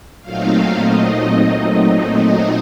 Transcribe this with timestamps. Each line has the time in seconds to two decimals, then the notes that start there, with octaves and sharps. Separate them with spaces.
0.22 A#2 F#3 A3 C4 D#4 F5
0.80 D#5